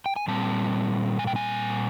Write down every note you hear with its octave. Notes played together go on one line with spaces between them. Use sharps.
G5
G#5
A#2 G3 C4 A5
G#5
G5
G#5